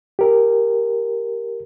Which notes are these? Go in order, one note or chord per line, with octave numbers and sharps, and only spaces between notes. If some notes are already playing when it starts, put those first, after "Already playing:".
G4 A#4